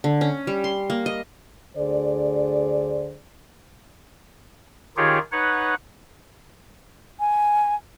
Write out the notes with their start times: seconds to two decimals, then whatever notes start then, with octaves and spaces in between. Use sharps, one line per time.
0.04 D3
0.21 C#4
0.47 G3
0.64 C6
0.90 A#3
1.06 D#5
1.77 D2 D3 G#4 C5 D5
4.97 D#3 D#4 F4 G4 G#4 C#5
5.32 D#4 B4 C#5 F#5
7.20 G#5